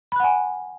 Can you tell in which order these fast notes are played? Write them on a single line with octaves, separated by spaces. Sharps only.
B5 F#6 F#5 G#5